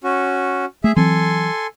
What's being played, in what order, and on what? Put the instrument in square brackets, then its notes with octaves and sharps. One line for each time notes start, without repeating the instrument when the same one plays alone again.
[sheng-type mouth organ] C#4 F#4
[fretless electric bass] A3 [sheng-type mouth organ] G#4 E5
[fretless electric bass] E3 F#3 C4 [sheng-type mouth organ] A4 G#5 C6